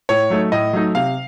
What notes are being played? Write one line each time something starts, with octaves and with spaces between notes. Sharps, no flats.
A2 C#5
F#3 A3 D#4
A2 D#5
F#3 A3 D#4
C3 F5